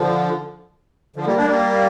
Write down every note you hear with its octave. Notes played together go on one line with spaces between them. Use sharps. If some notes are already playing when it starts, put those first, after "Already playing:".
Already playing: D3 F3
D3 F3
G3 A#3
A#3 D4
G3 A#3